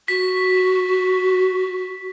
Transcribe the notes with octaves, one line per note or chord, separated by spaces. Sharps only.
F#4 B6